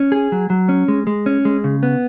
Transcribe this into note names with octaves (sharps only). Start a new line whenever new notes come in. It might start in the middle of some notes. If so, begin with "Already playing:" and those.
Already playing: C#4
G#4
F#3
F#3
C#4
G#3
G#3
C#4
G#3
C#3
B3